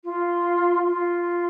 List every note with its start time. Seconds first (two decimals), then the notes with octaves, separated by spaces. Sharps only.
0.04 F4
0.86 F4